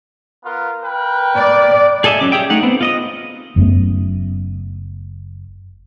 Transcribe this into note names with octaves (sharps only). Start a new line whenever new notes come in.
B3 F4 A#4
A#4 B4 G5
D5
G#4 A4 D#5 E5 G#5
F#3 C#4 D6
G4 G#4 E5 G5
A3 D#4 F#5
B3 C4
F4 D#5 D#6
F#1 F#2 A3 B3